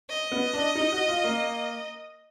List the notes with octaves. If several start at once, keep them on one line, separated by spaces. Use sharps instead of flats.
D#5
B3
D4
D#4
F#4
F4
A#3